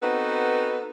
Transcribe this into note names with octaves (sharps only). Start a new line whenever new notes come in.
B3 C4 D#4 F#4 A4 B4